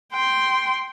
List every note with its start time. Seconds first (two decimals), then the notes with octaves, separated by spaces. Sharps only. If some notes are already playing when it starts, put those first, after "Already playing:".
0.13 G5 C6